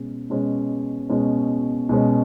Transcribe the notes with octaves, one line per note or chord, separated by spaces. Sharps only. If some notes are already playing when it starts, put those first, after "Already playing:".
Already playing: B2 G#3 C#4
B2 G#3 C#4
B2 G#3 C#4
B2 G#3 C#4